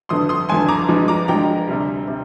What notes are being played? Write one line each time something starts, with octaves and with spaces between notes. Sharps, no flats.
G1 F2 D3 C6 D#6
C6 D#6
G1 F2 D3 G#5 C6
A#5 D6
G2 F3 G#3
A#5 D6
G2 F3 G#3 G5 A#5
D2 C3 G3
C3 G3